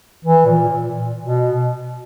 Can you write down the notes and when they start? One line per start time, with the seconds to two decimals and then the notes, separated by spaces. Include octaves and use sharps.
0.25 E3
0.46 A#2
0.68 A#2
1.22 B2